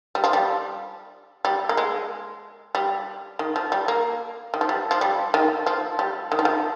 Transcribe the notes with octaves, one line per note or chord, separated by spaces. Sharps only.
G3
F3
G3
G3
A#3
G#3
G3
D#3
F3
G3
A#3
D#3
F3
G3
F3
G3
D#3
F3
G3
D#3
F3
D#3